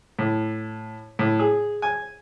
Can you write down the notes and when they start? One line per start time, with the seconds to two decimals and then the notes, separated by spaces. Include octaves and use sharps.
0.19 A2
1.19 A2
1.40 G#4
1.82 G#5